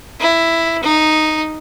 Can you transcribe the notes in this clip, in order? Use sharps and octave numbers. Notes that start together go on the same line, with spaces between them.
E4
D#4